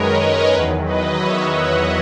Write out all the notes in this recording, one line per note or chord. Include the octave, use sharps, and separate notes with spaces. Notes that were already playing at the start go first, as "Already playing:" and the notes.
Already playing: F#2 D#3 G#3 A#4 B4 C#5 D#5
A#4 C#5
E2 D#3 F#3 G#4 B4
B4 D#5
C#5 E5
D#5 F#5